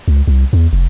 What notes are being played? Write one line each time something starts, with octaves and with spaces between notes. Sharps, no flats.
C#2
C2
E2
F1